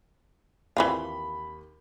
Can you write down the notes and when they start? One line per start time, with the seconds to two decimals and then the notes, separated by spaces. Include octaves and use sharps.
0.77 D#2 E3 C4 F4 B5 G7